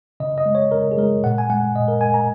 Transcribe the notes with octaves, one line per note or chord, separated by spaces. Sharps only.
C#3 D#5
D#5
G#3
C#5
C#3 A#4
G#4
G#3 A#4
A#2 F#5
G#5
G#3 F#5
A#2 D#5
A#4
G#3 G#5
A#5